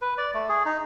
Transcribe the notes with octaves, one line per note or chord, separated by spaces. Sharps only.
B4
D5
A3
G#4
D#4